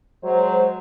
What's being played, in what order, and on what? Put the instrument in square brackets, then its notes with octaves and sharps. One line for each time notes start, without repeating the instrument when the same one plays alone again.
[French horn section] F#3 G#3 C5